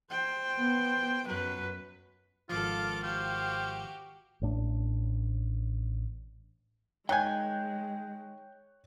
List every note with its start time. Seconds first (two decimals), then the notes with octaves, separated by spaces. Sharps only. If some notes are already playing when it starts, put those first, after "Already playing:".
0.11 C5 G5
0.57 B3
1.27 F#2 F#3 B4
2.49 G#1 F3 F4 A4 F5 D6
3.03 F#4 G4 C5 F5
4.41 A1 A2 D4
7.09 D#3 G#3 C#5 G5 G#5 F#6 G6